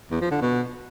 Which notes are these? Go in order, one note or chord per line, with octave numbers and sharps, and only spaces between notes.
E2
F3
D3
B2